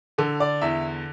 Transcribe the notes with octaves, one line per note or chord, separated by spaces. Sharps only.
D3 A4
D5
E2 E5